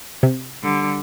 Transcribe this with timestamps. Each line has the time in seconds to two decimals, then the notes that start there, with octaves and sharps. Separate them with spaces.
0.23 C3
0.62 D3 G3